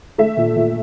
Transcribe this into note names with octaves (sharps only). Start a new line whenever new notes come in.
A3 E5
A#2
A#2